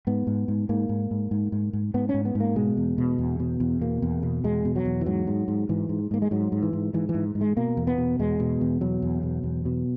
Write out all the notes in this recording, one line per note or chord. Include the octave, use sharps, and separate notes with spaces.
G#2 B3
G#2
G#2
G#2 A#3
G#2
G#2
G#2
G#2
G#2
G#2 B3
C#4
G#2
B3
G#2
A#3
B2 G#3
E2
B2
E2
B2
E2
B2 A#3
E2
B2
E2 G#3
B2
F#3
E2
E3
G#2 F#3
G#2
G#2
G#2 E3
G#2
G#2 A#3
G#3
G#2 F#3
G#2
E3
G#2
G#2 E3
E3
G#2
G#2
G#3
B2 A#3
E2
B3
B2
E2 G#3
B2
E2
B2 F#3
E2
B2
E2
B2